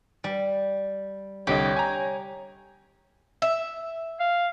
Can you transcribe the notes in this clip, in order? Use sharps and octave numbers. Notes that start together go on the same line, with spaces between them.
G3
C2 D3 G4 C#5 D#5
G#5 A#5
E5
F5